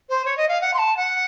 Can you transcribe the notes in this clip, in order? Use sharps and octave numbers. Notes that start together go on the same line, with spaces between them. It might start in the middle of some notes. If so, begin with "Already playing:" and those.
C5
C#5
D#5
F5
F#5
C6
A5
F#5